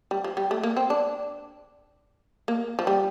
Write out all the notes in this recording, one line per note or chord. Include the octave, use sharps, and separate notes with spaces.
G3
F3
G3
A3
A#3
C4
D4
A#3
F3
G3